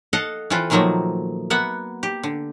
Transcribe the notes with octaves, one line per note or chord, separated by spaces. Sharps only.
A4 D#5 F5 F#5
E3 C4 F4 A4 B4
A#2 D#3 F3 F#3 A3 A#3
A#3 B3 E5 F#5
G4
D3